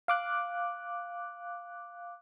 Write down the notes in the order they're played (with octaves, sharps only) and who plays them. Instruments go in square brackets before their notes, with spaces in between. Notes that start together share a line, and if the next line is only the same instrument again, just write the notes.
[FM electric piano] F5 D6 F#6